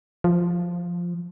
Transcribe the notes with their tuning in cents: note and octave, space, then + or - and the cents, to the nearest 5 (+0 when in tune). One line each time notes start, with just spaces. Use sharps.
F3 +0